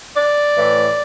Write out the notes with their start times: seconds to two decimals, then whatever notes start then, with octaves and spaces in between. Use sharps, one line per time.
0.14 D5
0.57 A2 E3